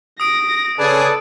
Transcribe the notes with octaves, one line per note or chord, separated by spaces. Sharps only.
D#6 A#6 D7
C#3 G#4 A4 B4 D5 A5